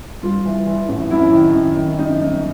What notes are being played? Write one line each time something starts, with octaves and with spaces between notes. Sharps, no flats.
G2 F4
E3
E3
A1
F#2 E4
D#3
F#2
D#3
F#2 D#4
G1